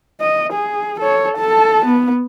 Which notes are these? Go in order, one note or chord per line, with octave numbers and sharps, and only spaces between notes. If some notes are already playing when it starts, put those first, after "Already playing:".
D#5
G#4
A4 C#5
A4 A5
B3